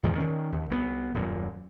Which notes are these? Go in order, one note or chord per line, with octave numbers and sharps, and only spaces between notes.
E2 G#2 D#3 F3
D#3 C#4
D#2
C2 A3 B3
D#1 F#2 A#2